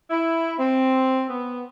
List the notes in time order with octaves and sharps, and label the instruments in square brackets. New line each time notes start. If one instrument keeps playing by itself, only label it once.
[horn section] E4
C4
B3